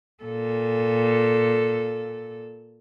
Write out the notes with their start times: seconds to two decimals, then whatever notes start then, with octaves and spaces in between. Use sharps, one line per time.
0.23 A#2 A4